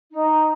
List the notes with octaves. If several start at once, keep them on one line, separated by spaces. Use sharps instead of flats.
D#4